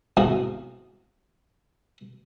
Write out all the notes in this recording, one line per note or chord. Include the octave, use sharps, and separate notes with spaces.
E2 G#2 C3 F#4 F5 D#6